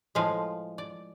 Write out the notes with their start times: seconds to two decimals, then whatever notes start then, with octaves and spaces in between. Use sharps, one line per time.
0.15 A2 F3 G#3 F5
0.78 D5